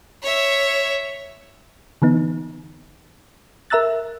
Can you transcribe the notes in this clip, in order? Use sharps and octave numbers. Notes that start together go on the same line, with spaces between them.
C#5 E5
D3 E3 B3 D#4
A#4 E5 A#5 E6 F#6 A6